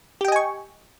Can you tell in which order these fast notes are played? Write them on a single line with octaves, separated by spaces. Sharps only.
G4 G5 D#5 G#5 C#6